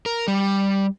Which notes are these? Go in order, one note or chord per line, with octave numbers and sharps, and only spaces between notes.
A#4
G3